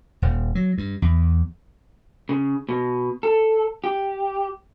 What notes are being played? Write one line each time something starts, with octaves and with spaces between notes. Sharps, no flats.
D#1
F#3
G2
E2
C#3
B2
A4
G4